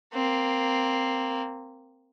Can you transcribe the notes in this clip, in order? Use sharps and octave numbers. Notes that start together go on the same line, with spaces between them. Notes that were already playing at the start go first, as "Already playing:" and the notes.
A#3 C4